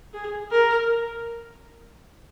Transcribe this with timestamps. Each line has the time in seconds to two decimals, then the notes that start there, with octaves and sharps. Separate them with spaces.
0.14 G#4
0.51 A#4